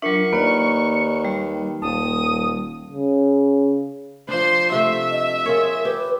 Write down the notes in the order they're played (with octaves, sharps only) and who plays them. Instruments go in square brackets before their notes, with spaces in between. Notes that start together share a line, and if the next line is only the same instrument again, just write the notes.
[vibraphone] F#3 D4 [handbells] F4 A#4 E5 [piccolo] C#6
[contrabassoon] D#2 [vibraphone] A#3 D5 [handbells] B4 B5 F6
[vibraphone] G3
[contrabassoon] D#1 [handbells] A#3 A5 [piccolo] D#6
[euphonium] C#3
[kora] F3 D4 [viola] C5 C6
[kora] C3 A3 [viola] E5
[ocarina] D#5
[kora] F4 G#4 C#5 [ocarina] A#4
[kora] G4 [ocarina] B4